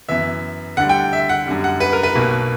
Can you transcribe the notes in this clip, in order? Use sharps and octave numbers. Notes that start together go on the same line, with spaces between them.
F#2 E3 B3 E5
D2 D3 G3 F#5
G5
E5
F#5
F#2 D3 G3
F#5
B4
A#4
B4
B1 B2 A#3